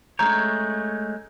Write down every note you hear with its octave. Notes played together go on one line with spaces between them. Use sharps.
G#3 A3 C#4 C#5 A#5 G6